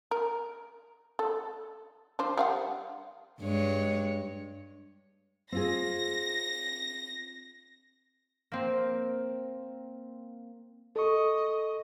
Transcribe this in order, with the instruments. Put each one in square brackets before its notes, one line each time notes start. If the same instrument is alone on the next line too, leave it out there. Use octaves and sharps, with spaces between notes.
[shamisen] A#4
A4
F3 D4 C5
G3 F5 F#5
[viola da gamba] G2 G#3 C#5
[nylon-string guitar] C4 F4 G#4 [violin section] A#6
[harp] A#3 C4
[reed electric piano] A4 C#6 [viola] D#5